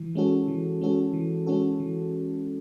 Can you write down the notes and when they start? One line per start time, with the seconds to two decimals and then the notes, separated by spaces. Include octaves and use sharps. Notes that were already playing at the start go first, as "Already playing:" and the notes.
Already playing: E3
0.15 G#3 C#4 F#4 A4
0.48 E3
0.81 G#3 C#4 F#4 A4
1.13 E3
1.47 G#3 C#4 F#4 A4
1.80 E3